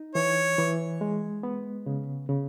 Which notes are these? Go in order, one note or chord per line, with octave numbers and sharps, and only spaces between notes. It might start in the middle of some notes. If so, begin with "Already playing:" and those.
Already playing: D#4
E3 C#5
E3
G#3
B3
C#3
C#3